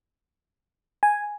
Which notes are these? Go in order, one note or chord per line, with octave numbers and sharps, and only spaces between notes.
G#5